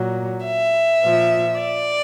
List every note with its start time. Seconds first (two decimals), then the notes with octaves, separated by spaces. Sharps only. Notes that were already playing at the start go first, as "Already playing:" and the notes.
Already playing: A#2 F#3
0.46 E5
1.03 A#2 F3
1.60 D5